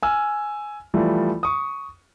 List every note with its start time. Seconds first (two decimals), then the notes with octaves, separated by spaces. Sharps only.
0.03 G#5 E6 F6
0.94 E3 F3 G3 A3 F4
1.43 C#6 D#6